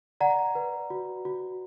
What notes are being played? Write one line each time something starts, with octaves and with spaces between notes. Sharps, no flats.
D5 F#5 A#5
B4
F#4
F#4